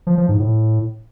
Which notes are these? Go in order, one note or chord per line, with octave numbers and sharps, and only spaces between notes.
F3
F3
G#2
A2